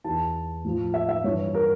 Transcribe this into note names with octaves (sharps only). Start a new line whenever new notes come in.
E2 E3 A5
A2 F3
E5
E5
G2 E3 C#5
A#4